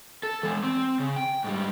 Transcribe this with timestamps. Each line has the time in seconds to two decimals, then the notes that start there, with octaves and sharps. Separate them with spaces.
0.23 A4
0.43 E3 G#3
0.64 C4
0.99 C#3
1.16 G5
1.44 G#2 G3